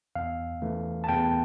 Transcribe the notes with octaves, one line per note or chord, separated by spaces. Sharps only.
E2 F5
E3 A3
A5
E2 G5